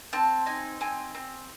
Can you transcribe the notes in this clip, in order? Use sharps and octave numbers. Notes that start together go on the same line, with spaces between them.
C4 A5
D#4 G#5
C4 G#5
C4